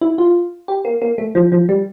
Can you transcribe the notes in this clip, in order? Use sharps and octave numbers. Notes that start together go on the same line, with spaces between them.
E4
F4
G4
A#3
A#3
A3
F3
F3
G3